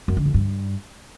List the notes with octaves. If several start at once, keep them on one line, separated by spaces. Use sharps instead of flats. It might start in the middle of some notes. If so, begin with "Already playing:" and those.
F#2
D3
F2
G2